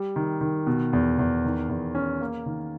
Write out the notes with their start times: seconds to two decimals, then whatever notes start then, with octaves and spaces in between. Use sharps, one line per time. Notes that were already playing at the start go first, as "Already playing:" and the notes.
Already playing: G3
0.16 D#3
0.41 D#3
0.67 B2
0.93 E2
1.19 E2
1.45 D#3
1.69 E2
1.95 C#4
2.21 A#3
2.46 D#3